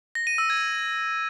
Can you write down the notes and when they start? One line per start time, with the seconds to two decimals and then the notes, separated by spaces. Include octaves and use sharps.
0.15 A#6
0.27 D#7
0.38 E6
0.50 G#6